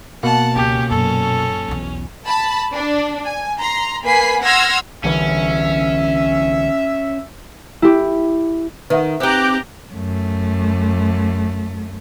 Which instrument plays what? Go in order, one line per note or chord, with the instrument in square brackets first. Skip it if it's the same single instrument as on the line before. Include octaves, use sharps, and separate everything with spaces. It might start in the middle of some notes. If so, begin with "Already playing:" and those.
[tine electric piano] B2 A#3 [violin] F#5 A5
[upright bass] C#2 B3 [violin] C#4 [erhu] G4
[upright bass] F#2 A#2 [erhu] A4
[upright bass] B1 E2
[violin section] A5 B5
D4
G#5
A#5 C6
A#3 B4 G#5 B5 B6 C7
F#5 C6 E6 F6 G#6 A#6
[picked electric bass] C2 D3 E3 [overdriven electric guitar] C#4 [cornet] E5
[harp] E4 G4
[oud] D#3 [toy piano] B4 E5 F#5
[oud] C4 D#4 [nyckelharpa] G4 A#5 [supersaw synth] D6 F#6 G6
[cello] F#2 A3